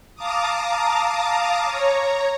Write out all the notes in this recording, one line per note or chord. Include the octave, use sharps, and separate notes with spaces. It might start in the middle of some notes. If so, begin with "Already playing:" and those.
F5 A5 A#5 D6 D#6
C#5 A#5